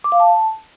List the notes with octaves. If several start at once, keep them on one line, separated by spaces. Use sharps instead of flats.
D6
F5
A5